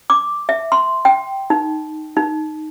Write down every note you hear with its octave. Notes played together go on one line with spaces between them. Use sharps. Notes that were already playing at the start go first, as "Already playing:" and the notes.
D6
E5
C6
G5
D#4
D#4